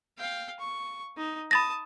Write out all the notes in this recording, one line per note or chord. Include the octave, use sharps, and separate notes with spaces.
F5 G5
C#6
D#4
A5 B5 D#6 A6 A#6